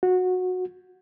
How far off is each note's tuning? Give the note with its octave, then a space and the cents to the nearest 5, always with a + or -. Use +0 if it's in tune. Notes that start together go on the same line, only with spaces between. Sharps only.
F#4 -15